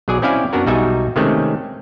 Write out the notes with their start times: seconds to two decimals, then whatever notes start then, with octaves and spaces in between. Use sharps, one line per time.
0.08 B1 F#3 G#4 D5 G#5
0.22 C4 C#4 E4 D5 F5 G#5
0.53 F#2 B3 D4 F#4 A#4
0.67 B1 G3 D#4 F#4 E5 G#5
1.16 C3 D#3 G#3 A3 C4 C#4